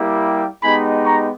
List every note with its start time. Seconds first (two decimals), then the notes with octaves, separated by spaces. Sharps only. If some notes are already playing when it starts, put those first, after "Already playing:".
Already playing: G3 A#3 E4 G4
0.63 G#3 B3 D#4 G4 G#5 B5
1.05 A#5 C#6